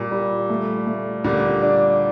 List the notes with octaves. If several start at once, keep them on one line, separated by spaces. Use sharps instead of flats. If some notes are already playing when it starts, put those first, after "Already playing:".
Already playing: A#2 G3
G3
A3
A3
A#2 D3 G3
D4